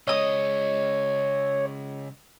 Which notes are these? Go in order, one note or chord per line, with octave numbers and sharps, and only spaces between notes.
C#3 G#3 C#5 D#5 D#6